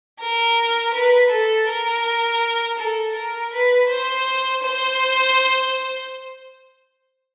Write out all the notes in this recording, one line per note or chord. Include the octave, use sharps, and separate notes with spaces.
A#4
B4
A4
A#4
A4
A#4
B4
C5
C5